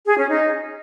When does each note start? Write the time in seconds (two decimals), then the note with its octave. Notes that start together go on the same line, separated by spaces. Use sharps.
0.06 G#4
0.17 C#4
0.29 D#4